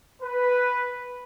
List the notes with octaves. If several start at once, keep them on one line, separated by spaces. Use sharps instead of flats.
B4